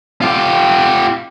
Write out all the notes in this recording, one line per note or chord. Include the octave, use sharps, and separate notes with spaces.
F4 G4